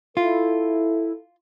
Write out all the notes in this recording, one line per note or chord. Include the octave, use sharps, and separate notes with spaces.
E4 F4 A4